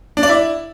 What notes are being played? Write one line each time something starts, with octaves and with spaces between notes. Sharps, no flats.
D4
D5
E4